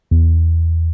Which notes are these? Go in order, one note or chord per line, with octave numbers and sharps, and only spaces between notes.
E2